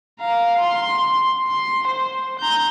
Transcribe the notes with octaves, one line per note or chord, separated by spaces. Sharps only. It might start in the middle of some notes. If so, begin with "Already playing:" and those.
F5 A#5
C6
C6
C5
A#5 G6